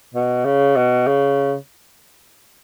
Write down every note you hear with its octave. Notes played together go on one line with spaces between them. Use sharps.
B2
C#3
B2
C#3